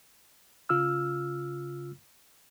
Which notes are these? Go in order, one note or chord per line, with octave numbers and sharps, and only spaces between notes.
C#3 F4 E6 F6